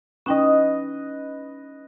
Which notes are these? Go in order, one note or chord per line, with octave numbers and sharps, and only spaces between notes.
C#4 D#4 B4 D#5 G5